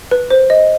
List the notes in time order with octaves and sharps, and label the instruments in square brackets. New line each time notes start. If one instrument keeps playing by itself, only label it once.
[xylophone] B4
C5
D#5